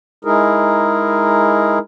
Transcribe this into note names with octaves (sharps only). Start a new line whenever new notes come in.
G#3 D#4 E4 G#4 A#4